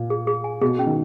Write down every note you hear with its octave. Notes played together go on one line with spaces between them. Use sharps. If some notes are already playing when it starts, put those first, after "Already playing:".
Already playing: A#2
G#4
G#4
G#5
B2 G#4
C#4
D#3